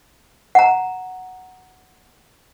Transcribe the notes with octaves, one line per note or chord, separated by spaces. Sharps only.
F#5 A#5